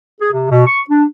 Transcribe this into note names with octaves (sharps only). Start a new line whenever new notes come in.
G#4
C3
B2
C#6
D4